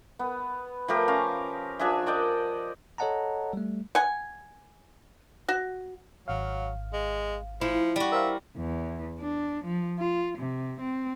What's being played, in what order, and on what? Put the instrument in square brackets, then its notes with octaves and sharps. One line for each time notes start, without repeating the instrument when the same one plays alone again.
[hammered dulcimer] B3
F3 A3 G4 A#4
C#4 F5 A#5
F3 D4 G#4 E5
A#4 D5 D#5 G5
[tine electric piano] A4 C#5 D#5 F#5 A5 A#5
G3 A3
[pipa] F#5 G#5
F#4
[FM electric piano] G#1 F5 [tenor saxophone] F#3
[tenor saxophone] G#3
[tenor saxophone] F3 [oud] E4
[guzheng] G3 F#4
[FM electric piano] A#4 C5 F5 [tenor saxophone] E5
[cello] E2
D4
F3
F4
C3
C4